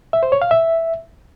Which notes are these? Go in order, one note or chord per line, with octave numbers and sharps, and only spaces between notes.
E5
C5
C#5
F5
E5